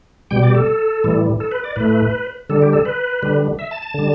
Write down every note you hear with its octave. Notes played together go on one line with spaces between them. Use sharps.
B2 G3 G5
D5
G4
A4
A2 E3 G3
A4
B4
D5
A2 A3 B4
D3 G3 A4
G4
A4
B4
D3 G3
E5
A5
A5
D3 G3